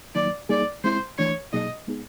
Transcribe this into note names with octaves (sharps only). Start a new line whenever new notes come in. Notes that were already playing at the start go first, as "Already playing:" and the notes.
D#3 F#3 A#3 D#4 D5
G3 A#3 D#4 G#4 D5
G#3 C4 E4 C5
E3 A3 D4 C#5
B2 F#3 A#3 D#4 G#4 D#5
G#3 B3 D#4 G#4